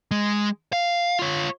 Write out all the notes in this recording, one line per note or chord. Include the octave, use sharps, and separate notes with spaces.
G#3
F5
F4 C#5